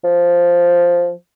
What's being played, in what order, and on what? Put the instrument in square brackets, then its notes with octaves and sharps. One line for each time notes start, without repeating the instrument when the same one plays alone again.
[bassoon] F3